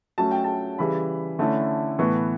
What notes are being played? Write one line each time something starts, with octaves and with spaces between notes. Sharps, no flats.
F#3 A3 C#4 A5
G5
A5
C#3 E3 G3 B5
D3 A3 C#4 E4
A2 E3 B3 C#6